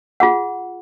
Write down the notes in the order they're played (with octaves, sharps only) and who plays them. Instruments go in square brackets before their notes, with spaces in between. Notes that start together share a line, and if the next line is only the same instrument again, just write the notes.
[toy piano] F4 G#4 F#5